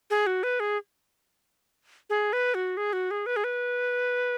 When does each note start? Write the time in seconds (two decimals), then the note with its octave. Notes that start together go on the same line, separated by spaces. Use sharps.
0.10 G#4
0.27 F#4
0.43 B4
0.60 G#4
2.10 G#4
2.33 B4
2.54 F#4
2.77 G#4
2.93 F#4
3.11 G#4
3.26 B4
3.36 G#4
3.44 B4